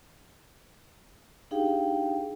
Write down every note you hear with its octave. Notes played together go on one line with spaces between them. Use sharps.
D4 D#4 G4 G#4 F5 G5